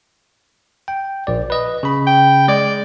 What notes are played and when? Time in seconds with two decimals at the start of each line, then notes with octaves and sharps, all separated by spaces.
0.88 G5
1.27 A#1 D5
1.50 B4 D#5
1.83 C#3 B5
2.07 G5
2.48 G#3 D5